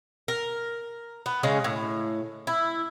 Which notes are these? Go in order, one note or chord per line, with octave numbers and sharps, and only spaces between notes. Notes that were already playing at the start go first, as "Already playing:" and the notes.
A#4
B3
C#3 G#3 C#4
A2
E4